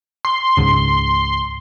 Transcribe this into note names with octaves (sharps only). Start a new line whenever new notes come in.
C6
C#2 G#2 C#3